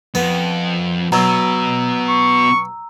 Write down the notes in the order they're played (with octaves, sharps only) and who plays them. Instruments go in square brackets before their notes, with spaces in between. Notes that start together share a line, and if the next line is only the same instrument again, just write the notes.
[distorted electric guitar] F2 [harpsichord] B3
[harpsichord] B2 F#3 [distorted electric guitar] B3 F#4 [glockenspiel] A#5 E6
[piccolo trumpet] C#6